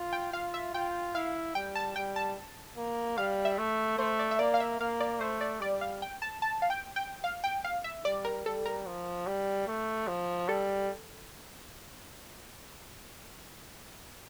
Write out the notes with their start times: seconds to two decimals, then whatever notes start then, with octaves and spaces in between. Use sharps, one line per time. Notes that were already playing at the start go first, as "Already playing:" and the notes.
Already playing: F4
0.13 G5
0.33 F4 F5
0.54 E5
0.74 F4 G5
1.15 E4 F5
1.55 G3 G5
1.75 A5
1.96 G3 G5
2.16 A5
2.78 A#3
3.18 G3 F5
3.45 E5
3.58 A3
3.98 A3 C5
4.19 D5
4.31 E5
4.39 A#3 D5
4.54 F5
4.60 E5
4.80 A#3 F5
5.00 D5
5.20 A3 C5
5.41 D5
5.61 G3 D5
5.81 F5
6.02 G5
6.22 A5
6.42 A5
6.62 F5
6.70 G5
6.96 G5
7.24 F5
7.44 G5
7.64 F5
7.84 E5
8.05 G3 D5
8.25 A#4
8.45 G3 A4
8.66 A#4
8.86 F3
9.27 G3
9.67 A3
10.07 F3
10.48 G3 A4